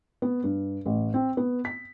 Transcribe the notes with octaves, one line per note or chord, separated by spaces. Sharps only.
B3
G2
A1
C4
B3
B6